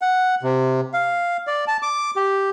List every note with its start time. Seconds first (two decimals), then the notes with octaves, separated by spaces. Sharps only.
0.02 F#5
0.43 C3
0.94 F5
1.47 D5
1.68 A5
1.82 D6
2.16 G4